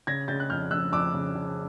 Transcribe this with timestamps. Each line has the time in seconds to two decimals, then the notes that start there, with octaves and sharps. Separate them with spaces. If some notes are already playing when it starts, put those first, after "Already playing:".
0.07 C#3 G#6 A#6
0.28 C#3 G6 A6
0.40 F#6
0.50 F2 F6 G6
0.71 F2 E6 F#6
0.92 F2 D6 E6
1.14 C#3
1.35 C#3